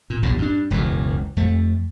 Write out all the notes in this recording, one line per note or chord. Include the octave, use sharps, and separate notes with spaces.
A#2
B1 E2 G2 A#2
G2 D4
E1 C#2 F#2 E3
F2 A3